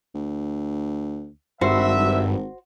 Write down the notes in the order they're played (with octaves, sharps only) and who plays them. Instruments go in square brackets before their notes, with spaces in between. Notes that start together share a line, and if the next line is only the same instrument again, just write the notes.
[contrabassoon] D2
[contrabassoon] G#1 [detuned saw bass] G2 [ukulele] F#4 C5 [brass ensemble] B4 E5